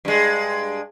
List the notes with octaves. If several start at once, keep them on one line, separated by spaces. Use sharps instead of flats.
G2 G#3